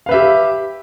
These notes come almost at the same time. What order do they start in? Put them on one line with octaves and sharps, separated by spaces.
F5 B4 E5 G4